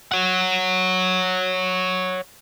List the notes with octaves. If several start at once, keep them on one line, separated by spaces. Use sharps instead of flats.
C#5 F#5